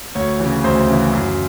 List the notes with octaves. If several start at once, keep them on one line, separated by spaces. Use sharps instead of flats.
D2 C#5
C#3 E3 C#5
D2 C5
C#3 E3
F#2